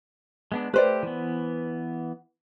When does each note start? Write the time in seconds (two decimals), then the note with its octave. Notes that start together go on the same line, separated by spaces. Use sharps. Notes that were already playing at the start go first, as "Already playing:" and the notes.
0.52 G#3 B3 D4
0.74 A3 G4 B4 C5 D5
1.03 E3 B3